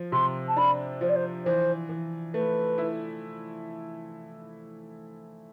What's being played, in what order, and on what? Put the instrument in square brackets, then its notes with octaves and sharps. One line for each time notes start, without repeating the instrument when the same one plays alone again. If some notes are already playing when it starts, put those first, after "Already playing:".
Already playing: [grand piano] F3
[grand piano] C3 [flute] C6
[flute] A5
[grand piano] D4 [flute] B5
[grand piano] F3 [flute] C5
[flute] D5
C5
[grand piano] E3 [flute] C5
[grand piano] E3
[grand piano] A3 [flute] B4
[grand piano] E4